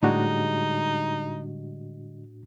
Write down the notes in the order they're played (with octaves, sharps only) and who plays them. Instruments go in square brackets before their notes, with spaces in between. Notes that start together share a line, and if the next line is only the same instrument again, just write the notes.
[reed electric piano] A2 D4 F#4 [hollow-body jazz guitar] D3 G3 G#3 [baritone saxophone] D#4